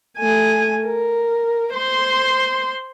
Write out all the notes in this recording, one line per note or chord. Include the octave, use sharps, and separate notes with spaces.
A3 G#5
A#4
C5 C6